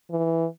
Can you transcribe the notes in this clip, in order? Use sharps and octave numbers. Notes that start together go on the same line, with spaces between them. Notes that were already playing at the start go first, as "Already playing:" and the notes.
E3